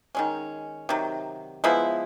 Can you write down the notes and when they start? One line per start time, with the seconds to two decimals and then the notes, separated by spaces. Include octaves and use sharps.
0.15 D#3 G#3 C#4
0.89 C3 D#3 F#3
1.64 F3 G#3 B3 E4